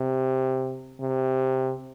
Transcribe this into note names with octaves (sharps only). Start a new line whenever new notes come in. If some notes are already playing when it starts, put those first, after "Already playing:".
Already playing: C3
C3